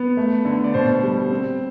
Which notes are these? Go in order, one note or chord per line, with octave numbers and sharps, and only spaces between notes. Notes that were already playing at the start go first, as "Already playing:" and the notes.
Already playing: B3
A3
D3
D5
B2 C5
G3
C4